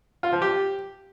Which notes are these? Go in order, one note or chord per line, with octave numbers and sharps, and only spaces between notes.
F4
F3
G4